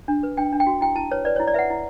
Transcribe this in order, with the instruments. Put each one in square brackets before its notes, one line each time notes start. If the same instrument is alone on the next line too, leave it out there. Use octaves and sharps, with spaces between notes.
[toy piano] D4
B4
D4 G5
D4
G5
F#4
E4 G5
E4 A5
B4 C#5
B4 D5
E4 C#5
D5
B4 E5 F#5
E4